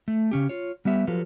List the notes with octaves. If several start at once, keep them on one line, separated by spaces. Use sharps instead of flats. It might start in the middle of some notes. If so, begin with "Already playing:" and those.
A3
C#3 C#4 G4
F4 C#5
G3 B3 G4 E5
F3 F#3 F4 G4 A4 B4